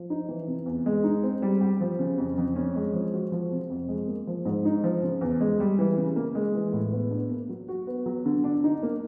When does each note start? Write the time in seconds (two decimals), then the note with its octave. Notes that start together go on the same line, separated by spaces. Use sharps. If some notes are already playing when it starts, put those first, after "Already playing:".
Already playing: F3
0.10 D#4
0.29 E3
0.47 C3
0.66 E2
0.86 G#3
1.04 D#4
1.23 C4
1.42 G3
1.61 G4
1.80 F3
1.99 C#3
2.18 F2
2.38 F2
2.56 C#4
2.76 G#3
2.94 F3
3.14 F#4
3.32 F3
3.52 C3
3.70 F2
3.88 G#3
4.08 A#3
4.27 F3
4.45 G#2
4.65 D#4
4.84 F3
5.03 C#3
5.21 E2
5.41 G#3
5.60 G3
5.79 E3
5.97 C#3
6.16 A#3
6.35 G#3
6.54 E3
6.73 A2
6.93 B3
7.11 D4
7.30 A#3
7.49 F#3
7.68 F#4
7.87 B3
8.06 F#3
8.26 D3
8.44 D4
8.64 D#4
8.83 A#3